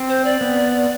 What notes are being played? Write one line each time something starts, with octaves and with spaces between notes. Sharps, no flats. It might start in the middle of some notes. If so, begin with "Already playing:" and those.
Already playing: C4
C5
D5
B3